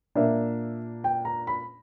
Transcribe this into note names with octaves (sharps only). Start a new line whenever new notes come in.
A#2 A#3 D4 E5
G5
A#5
B5